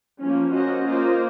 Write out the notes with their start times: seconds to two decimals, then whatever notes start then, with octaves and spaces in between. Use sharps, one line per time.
0.21 F3 A#3 C#4
0.54 A#3 C#4 F#4 C5 D#5
0.88 A#3 F4 C5 D#5